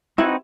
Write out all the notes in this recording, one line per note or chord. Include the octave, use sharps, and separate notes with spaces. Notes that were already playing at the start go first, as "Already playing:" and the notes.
C4 D#4 E4 F#4 B4